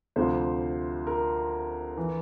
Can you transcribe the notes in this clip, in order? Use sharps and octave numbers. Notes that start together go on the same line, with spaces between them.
D2 C3 F3 C5
A#4
E3